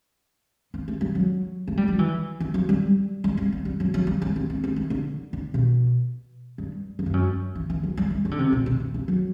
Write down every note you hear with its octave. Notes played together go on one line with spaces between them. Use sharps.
B3
A3
G3
F#3
A3
G3
F#3
E3
E3
F#3
G3
G3
C4
B3
G3
F#3
F#3
G3
C4
B3
C4
B3
A3
D3
D3
B2
G2
F#2
G2
F#2
E3
E3
F#3
G3
E3
E3
D3
C3
B2
C3
C3
E3
F#3